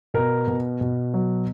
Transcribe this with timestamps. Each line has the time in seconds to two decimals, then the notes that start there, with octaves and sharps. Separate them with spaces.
0.14 B2 A#4
0.48 B2
0.81 B2
1.14 F#3